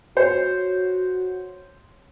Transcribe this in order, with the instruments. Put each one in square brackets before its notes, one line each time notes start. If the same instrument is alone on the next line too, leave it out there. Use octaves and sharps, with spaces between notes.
[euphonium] F#4 [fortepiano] C5 C#5